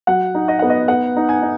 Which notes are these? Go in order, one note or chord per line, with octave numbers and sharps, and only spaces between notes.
F#3 F#5
D#4
D#5
B3 F#5
D#5
B3 F#5
D#4
G#5
D#4